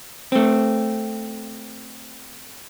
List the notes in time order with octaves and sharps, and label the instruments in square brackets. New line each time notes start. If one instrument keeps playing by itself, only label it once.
[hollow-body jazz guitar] A3 C4